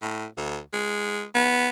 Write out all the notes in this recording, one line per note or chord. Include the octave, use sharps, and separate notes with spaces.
A2
D2
G#3
B3